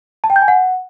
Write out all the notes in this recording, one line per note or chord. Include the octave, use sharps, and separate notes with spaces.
A5
G5
G6
G#5
F#5